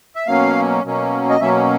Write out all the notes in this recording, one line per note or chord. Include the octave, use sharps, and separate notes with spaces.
E5
B2 F#3 A#3 C#4 F5
B2 F#3 A#3 C#4
D#5
B2 F#3 A#3 C#4 E5